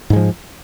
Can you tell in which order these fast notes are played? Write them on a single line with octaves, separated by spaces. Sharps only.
G#2 G#3 F3